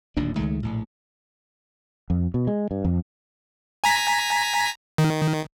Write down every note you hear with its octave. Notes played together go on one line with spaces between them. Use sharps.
D1 D#2 A#2 D4
C#2 D#3 G#3 A3
A#1 A2
F2
B2
G#3
G2
F2
G#5 A#5 B6
D#3